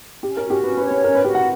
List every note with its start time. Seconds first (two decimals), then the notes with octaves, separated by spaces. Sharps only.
0.23 C#4 G4
0.37 A#4
0.43 F#4
0.50 G4
0.64 C#4 B4
0.77 B4
0.84 C#5
0.90 B4
1.04 C#4 A#4
1.15 B4
1.24 F#4 G4
1.35 F#5